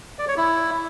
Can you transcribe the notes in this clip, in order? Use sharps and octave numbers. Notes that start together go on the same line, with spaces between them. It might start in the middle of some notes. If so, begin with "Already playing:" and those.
D5
C#5
E4